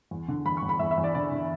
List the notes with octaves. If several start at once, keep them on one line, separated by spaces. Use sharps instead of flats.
E2
D3
E2 B5
C#6
E2
B5
E2 E5
E5
E2
D5
D3 D5
D3